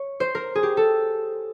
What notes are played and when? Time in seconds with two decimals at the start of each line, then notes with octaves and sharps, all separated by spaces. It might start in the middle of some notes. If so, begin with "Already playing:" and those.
Already playing: C#5
0.20 C5
0.35 A#4
0.55 G#4
0.63 G4
0.77 A4